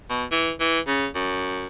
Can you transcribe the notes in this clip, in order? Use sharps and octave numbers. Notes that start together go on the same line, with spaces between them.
B2
E3
E3
C#3
F#2